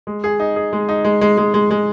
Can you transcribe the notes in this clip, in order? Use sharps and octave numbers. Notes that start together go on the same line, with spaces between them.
G#3
G#4
D#4
G#4
G#3
D#4
G#3
G#3
G#3
G#3
G#3